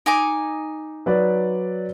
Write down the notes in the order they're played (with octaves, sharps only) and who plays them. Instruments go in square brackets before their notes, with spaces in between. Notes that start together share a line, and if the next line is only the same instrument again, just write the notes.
[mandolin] D#4 G#5 D6
[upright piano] F#3 B4 D5